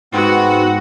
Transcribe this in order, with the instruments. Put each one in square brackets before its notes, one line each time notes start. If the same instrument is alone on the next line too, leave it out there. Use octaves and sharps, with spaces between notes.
[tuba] G#2 [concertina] B3 C4 [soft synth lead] D#4 [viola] F#4